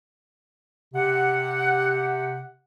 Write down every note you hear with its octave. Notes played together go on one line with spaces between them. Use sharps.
C3 G4 F#5